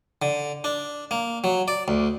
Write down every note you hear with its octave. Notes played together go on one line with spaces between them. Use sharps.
D3
D4
A#3
F#3
D5
D2